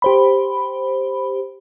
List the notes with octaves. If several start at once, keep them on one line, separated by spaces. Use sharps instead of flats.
G4 C5 B5